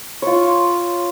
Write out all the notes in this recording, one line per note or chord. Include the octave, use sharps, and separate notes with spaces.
F4 C#5